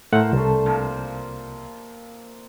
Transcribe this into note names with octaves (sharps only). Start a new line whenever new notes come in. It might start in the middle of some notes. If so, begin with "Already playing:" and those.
A2 A3 A#4 C5 F#5
C2 D3 A3
C3 F3 A#3